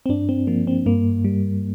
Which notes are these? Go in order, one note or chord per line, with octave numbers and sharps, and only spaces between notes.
C4
G2 D4
C4
F3 A#3
C4
G2 A#3
G3